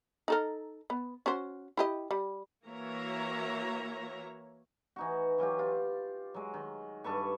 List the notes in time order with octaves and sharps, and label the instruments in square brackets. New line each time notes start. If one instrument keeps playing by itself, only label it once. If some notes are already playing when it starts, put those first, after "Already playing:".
[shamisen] D#4 A4 A#4
B3
C#4 F#4 C5
E4 G4 D#5
G3
[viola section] E3 A#3 F#4 C#5 E5 A#5
[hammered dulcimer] E3 D#4 F#4
E3 F#3 F4 G4
F4
F#3 G#3
D#3
G2 A4 B4 C#6